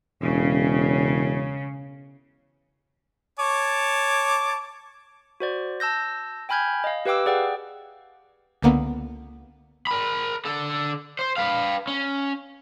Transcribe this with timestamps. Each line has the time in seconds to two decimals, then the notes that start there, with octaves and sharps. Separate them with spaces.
0.21 E1 C#3
3.39 C#5 A5 D6
5.40 F#4 C5 D5
5.80 A5 E6 G6 A#6
6.49 G5 G#5 B5 F6 G6 G#6
6.84 D#5 F5
7.06 G4 B4 F5 G5 D6 E6
7.26 G#4 D5 F#5 G5
8.62 C#2 D3 A#3 B3
9.87 A#4 B5
10.45 D3 A4
11.19 C5
11.37 B4 F5
11.87 C#4